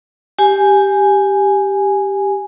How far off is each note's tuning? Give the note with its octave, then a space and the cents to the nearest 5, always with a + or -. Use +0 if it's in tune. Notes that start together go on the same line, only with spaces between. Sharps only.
G4 +0 G#5 +0